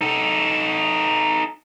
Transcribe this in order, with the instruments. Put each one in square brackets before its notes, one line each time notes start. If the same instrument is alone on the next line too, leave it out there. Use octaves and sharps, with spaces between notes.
[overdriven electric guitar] D#4 A4